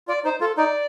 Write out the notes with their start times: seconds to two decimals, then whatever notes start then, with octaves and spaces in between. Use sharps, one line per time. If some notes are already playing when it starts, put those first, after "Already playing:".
0.08 F4 D5
0.24 D#4 C5
0.41 F4 A4
0.57 D#4 D5